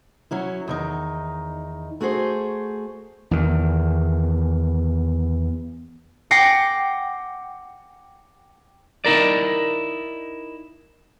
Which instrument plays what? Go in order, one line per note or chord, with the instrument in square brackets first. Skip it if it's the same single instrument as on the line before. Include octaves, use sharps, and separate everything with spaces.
[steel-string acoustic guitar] F#3 C#4 E4
E2 D#3 D#4
A3 F#4 G#4 C5
[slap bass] E2 D#3
[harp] F#5 G5 D6 A#6 C7
[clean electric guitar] D#4 E4 A#4 D5